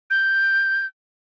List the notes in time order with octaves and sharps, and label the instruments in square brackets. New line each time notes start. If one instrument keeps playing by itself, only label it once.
[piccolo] G6